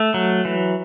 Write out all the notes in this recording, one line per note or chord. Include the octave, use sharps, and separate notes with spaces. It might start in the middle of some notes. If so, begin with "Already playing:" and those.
Already playing: A3
F#3
E3